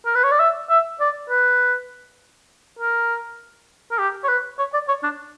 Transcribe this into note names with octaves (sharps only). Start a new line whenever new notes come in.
A#4
B4
C#5
D5
E5
E5
D5
B4
A#4
A#4
G4
C#5
B4
C#5
D5
C#5
D4